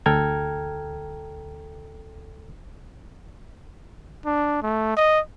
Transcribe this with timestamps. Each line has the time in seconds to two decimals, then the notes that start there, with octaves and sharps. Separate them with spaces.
0.06 D2 A4 G5 A#5 F6 G#6
4.26 D4
4.62 A3
4.97 D#5